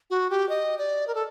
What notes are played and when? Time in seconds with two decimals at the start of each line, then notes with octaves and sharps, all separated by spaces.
0.10 F#4
0.30 G4
0.49 D#5
0.78 D5
1.08 A#4
1.15 A4